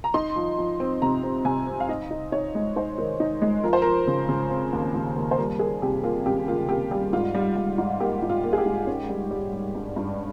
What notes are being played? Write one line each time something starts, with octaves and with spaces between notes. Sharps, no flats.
A#5
D#4 C6
F3
F3
C4
C3 A#5
C4
C3 G#5
C4
F5
D#4 D#5
D#4
D#4 C#5
G#3
D#4 C5
D#3
D#4
G#3
F3 A#4
C5
F3 A#4
C#3
C#3
C4
D#2
D#2
D#2
C5
G3 A#4
A#3 G#4
C3 G4
A#3 F4
C#2 G4
A#3 F4
A#3 G4
G3 G4
G#2 F4
G3
G3
G#2
A#3 G4
G#2
F4
A#3
G#4
G4
G#2
C#4
G3
G3
G3
G2
G2